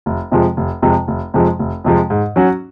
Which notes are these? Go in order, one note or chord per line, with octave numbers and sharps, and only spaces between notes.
F1
F2 C3 F3 G#3
F1
F2 C3 F3 G#3
F1
F2 C3 F3 G#3
F1
F2 C3 F3 G#3
G#2
F#3 C#4 F#4